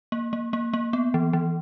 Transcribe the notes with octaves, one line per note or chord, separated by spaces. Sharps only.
A#3
A#3
A#3
A#3
B3
E3
E3